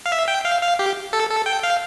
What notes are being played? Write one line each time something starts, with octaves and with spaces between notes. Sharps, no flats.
F5
E5
G5
F5
F5
G4
A4
A4
G5
F5